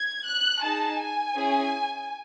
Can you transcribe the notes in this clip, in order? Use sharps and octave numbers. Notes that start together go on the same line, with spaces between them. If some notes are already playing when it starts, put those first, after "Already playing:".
Already playing: G#6
F#6
D#4 G#4 A5
G#5
C#4 E4 G#4